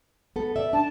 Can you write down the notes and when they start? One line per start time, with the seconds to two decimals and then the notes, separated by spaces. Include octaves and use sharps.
0.36 B3 A4
0.56 D5 E5
0.73 D4 A5